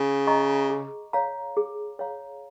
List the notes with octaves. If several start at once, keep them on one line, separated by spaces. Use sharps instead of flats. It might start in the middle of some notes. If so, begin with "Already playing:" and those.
Already playing: C#3
D#5 A#5 C#6
G#4
C#5 F5 A#5
G#4
C#5 F5 A#5